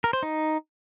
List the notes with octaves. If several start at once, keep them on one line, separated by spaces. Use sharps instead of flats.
A#4
C5
D#4